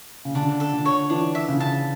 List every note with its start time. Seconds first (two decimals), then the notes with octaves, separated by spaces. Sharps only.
0.25 C#3
0.35 D3 D4
0.60 A4
0.73 D3
0.85 C#5
1.10 E3 D4
1.35 E5
1.48 C#3
1.60 A5